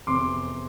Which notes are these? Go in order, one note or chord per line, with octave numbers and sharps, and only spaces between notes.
F1 E2 C3 C6 D6